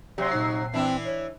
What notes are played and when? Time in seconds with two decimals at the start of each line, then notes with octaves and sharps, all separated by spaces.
0.18 C3 F#3 G4 D5 G5 C6
0.31 A#2 D#4 C7
0.74 E3 C4 D4 E4
1.05 C#5